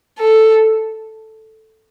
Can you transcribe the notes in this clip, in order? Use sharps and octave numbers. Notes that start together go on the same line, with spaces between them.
A4